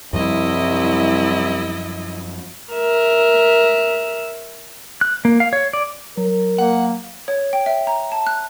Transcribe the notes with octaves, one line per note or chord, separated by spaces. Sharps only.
C2 F#2 F3 G3 E4 D#5
A#4 E5
F#6
A#3
F5
C#5
D5
F#3 A#4
A#3 F#5
C#5
G5
E5
A#5
A5
F#6